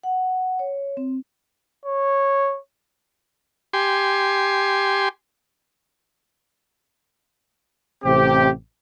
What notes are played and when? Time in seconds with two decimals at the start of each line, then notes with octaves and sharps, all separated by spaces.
0.03 F#5
0.59 C#5
0.97 C4
1.85 C#5
3.73 G4 G#5 C6
8.04 A1 C3 C4 G4